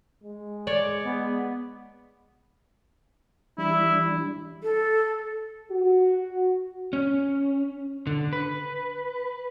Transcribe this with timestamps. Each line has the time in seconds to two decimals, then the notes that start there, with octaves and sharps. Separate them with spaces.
0.24 G#3
0.67 C#5 D5
1.04 B3
3.58 E3 G3 D4 E4
4.63 A4
5.71 F#4
6.93 C#4
8.07 D3
8.33 B4